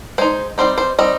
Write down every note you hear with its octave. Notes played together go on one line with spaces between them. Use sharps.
G#3 D#4 C5
G3 C4 D#4 C5
C5
G3 C4 D#4 D#5